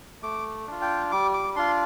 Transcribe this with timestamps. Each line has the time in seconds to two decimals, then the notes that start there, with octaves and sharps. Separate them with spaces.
0.23 A3 D6
0.67 D4 F4
0.82 G5
1.11 G3 D6
1.34 D6
1.56 D4 F4 C6